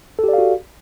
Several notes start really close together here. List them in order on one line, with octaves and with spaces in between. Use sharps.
A4 G4 D5 F5 F#4